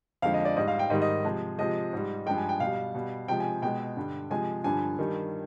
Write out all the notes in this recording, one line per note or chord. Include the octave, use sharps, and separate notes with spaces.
F2 D3 G#3 F5
D#5
D5
G#2 G3 D#5
F5
G5
G#2 D#3 G3 D#5
D#5
C3 F3 G#3
C3 F3 G#3 D#5
G#2 G3
G2 F3 G#3 G5
G#5
G5
B2 G3 F5
B2 G3
C3 F3 G#3 G5
G#5
B2 G#3 G5
G2 D3 G3
C3 F3 G#3 G#5
G2 D3 F3 G#5
G2 D#3 G3